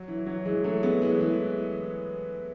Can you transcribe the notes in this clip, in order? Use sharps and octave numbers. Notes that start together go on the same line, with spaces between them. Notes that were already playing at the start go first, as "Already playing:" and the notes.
Already playing: F#3
E3
F#3
E3 G#3
F#3 A3
G#3 B3
E3 G#3
E3